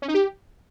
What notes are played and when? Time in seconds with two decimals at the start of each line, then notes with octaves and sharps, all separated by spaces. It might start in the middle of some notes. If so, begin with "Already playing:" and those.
0.02 C#4
0.08 D#4
0.14 G4